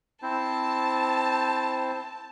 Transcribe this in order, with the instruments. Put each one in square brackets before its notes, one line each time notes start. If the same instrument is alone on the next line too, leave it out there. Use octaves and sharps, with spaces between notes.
[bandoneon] C4 E4 C5 [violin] A5